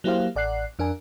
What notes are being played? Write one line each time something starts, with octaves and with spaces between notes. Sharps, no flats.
F#3 A#3 E4 G4 C5 F5
A1 D5 F#5 F#6 C7
F2 D4 A#4 G#5